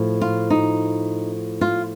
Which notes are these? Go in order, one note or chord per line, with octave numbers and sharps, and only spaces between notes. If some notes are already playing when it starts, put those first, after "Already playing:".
Already playing: A2 F3
F4
D#4
F4